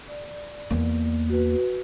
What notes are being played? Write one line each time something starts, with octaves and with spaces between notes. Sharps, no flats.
D5
E2 A#3
F#4 B4